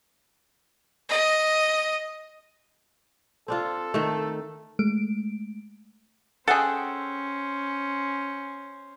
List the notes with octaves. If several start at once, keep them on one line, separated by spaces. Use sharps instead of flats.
D#5
C4 D4 F4 A4
D#3 A3
G#3 A3 D7
C#4 G#4 A4 C5 E5 F#5 G5